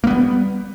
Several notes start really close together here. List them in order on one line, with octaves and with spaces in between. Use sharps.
A#3 B3 G3